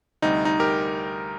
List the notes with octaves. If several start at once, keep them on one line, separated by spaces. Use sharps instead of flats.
D2 C3 G3 D#4
D#4
G4 A#4